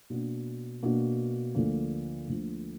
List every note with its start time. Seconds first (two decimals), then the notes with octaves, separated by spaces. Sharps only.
0.10 B2 A#3 D4 F#4
0.83 B2 A#3 D4 F#4
1.55 D2 D3 F3 A#3
2.28 D2 D3 F3 A#3